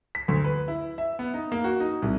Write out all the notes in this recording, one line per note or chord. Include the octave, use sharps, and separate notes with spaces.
B6
D2
B4
E4
E5
B3
D#4
A#3
F#4
D#4
C2